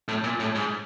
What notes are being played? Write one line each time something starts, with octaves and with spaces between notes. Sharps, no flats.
A2
A#2
A2
G#2